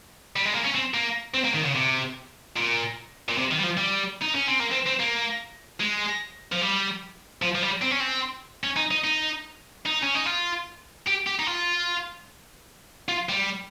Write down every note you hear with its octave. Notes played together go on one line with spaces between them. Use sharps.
G3
G#3
A#3
C#4
C4
A#3
C4
A#3
D#3
C#3
C3
A#2
A#2
C3
D#3
G3
F3
G3
D#4
C#4
C4
A#3
C4
C4
A#3
G#3
F3
G3
F3
F3
G3
C4
C#4
C4
C#4
D#4
D#4
D#4
D#4
C#4
D#4
F4
G4
G4
D#4
F4
F4
G3